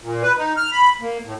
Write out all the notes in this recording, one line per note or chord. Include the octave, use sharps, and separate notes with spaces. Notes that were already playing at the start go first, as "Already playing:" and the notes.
A#2
B4
D#4
F6
B5
A#3
A2